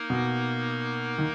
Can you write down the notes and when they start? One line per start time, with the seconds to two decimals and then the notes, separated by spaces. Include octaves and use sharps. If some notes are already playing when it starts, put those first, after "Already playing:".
Already playing: A#3 D#4 A#4
0.10 B2
1.18 D#3